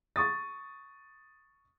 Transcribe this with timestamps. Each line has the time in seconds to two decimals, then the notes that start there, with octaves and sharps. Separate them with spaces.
0.16 C#6 D#6 A6